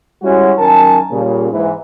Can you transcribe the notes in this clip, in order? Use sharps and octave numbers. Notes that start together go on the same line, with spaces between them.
G3 G#3 C#4 E4 F#4
F#2 D#3 A#4 G#5 A5
A#2 C#3 G3
G#2 E3